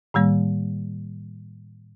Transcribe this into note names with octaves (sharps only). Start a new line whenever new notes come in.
A2 D#3 G3 A#3